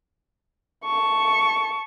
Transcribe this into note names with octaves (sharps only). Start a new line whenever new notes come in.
A5 C#6